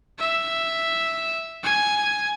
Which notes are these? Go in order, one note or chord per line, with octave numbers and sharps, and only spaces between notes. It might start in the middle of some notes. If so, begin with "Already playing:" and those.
E5
G#5